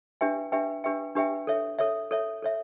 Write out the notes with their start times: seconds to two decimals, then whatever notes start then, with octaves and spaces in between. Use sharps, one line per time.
0.21 D4 G4 B4 E5 G5
0.52 D4 G4 B4 E5 G5
0.84 D4 G4 B4 E5 G5
1.15 D4 G4 B4 E5 G5
1.47 A4 C#5 E5
1.79 A4 C#5 E5
2.11 A4 C#5 E5
2.42 A4 C#5 E5